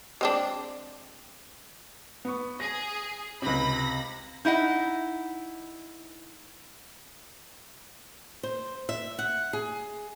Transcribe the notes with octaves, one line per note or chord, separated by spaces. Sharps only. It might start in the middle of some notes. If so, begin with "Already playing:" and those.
G#3 C4 D4
B3 C#6
G#4 A#6
C#2 C3 B5 A#6
D#4 E4 D#5 F#5
C5
E5
F#5
G#4